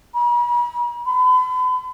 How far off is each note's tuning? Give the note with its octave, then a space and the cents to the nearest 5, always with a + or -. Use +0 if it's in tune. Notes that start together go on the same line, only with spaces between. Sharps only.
B5 -45
B5 +40